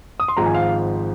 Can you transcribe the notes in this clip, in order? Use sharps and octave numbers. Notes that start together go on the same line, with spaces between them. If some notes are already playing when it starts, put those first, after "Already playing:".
D#6
C6
G#1 G#2 F3 A#5
G#5
F5